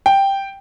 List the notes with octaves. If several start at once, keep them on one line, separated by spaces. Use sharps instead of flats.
G5